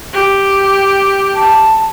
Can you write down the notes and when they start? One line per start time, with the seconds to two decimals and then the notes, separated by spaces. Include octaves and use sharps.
0.13 G4
1.35 A5